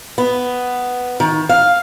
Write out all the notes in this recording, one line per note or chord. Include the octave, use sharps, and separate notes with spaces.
B3
D#3
F5